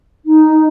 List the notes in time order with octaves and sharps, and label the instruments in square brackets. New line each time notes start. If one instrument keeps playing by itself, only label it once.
[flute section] D#4